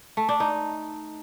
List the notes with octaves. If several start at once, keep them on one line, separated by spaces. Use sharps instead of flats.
A3
D4
D#4